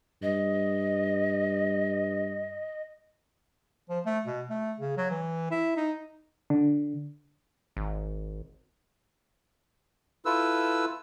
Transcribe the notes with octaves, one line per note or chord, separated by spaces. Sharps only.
G2 D#5
F3
A3
B2
A3
C#3
F#3
E3
E4
D#4
D3
G#1
E4 F4 A4 B4 E6